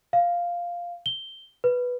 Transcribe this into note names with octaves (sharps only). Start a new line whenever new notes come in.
F5
G7
B4